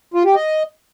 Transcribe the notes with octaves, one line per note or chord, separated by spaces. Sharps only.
F4
G4
D#5